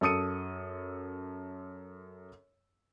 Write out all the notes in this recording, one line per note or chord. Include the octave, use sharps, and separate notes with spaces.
F#2 A4 D#6 C#7 D#7